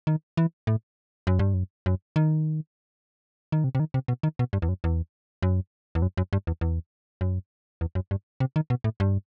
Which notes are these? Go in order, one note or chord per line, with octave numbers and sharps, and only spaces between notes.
D#3
E3
A2
F#2
G2
F#2
F#2
D#3
D#3
C3
C3
D#3
C3
B2
D#3
B2
G2
E2
F#2
E2
F#2
E2
F#2
F#2
G2
E2
E2
F#2
E2
F#2
G2
C3
D#3
B2
A2
G2